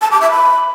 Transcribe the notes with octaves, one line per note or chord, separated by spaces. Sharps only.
A5
D6
E5
B5